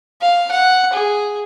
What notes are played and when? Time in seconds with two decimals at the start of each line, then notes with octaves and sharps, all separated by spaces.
0.22 F5
0.51 F#5
0.93 G#4